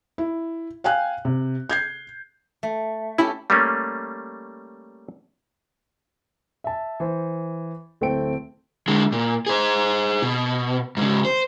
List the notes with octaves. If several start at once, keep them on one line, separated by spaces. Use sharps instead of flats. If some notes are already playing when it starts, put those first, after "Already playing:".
E4
F5 G5 G#5 F#6
C3
G6 G#6 C7
A3
C#4 E4 G4 A4
G3 A3 A#3 C#4
E5 A5
E3 C5
D1 A3 C4 G5 D7
D3 G#3
A#2
G#4 C5
B2
G#2 C#3
C5